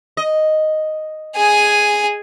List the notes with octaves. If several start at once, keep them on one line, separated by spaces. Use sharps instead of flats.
D#5
G#4 G#5